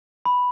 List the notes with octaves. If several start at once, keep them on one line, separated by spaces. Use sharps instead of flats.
B5